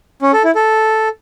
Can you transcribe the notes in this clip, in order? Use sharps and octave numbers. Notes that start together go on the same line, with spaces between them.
C#4
A4
E4
A4